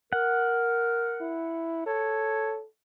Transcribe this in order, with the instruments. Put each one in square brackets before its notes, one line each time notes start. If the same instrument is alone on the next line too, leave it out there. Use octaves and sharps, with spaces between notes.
[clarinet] A#4 [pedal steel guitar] F#5
[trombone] E4
[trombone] A4 [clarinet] C#5